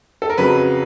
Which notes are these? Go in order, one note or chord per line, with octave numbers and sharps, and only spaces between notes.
A4
A#4
F2 C#3 F#3 B4